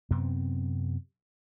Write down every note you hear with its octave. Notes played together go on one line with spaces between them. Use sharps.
F#2 C3 B3 C4